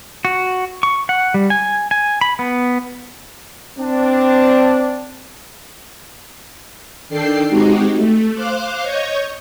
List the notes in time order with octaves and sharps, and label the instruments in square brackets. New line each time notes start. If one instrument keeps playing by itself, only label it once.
[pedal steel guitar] F#4
C#6
F#5
G3
G#5
G#5
B5
B3
[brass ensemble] C4 D4
[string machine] D#3 D4 A4 G5 C7
G#3 C4 D#4 F#4 G4
A3
C5 F5 D6 F#6
C#5 D#5 C#6 G6